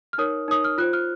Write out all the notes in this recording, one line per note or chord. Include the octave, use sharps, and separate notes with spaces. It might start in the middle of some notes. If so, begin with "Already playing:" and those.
F6
D#4 A#4 C#5 D#6
D#4 A#4 C#5 D#6
F6
F4 C5 F#6
F6